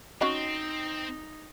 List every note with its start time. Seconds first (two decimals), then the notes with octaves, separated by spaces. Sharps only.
0.21 C4 C#4 D#4 F#4 D#5